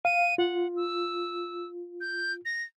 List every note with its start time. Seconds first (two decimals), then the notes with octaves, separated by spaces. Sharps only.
0.05 F5 D#7
0.38 F4 F#5
0.76 E6
2.01 G6
2.45 A#6